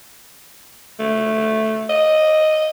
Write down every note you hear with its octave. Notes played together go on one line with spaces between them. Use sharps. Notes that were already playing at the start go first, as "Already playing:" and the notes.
A3
D#5